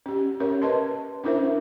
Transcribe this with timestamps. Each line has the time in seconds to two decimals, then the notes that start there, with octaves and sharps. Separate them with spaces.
0.06 C#4 G4
0.40 C#4 A#4 C#5
0.62 B4 D#5 A5 C6
1.24 C#4 D4 E4 A#4 C5 E5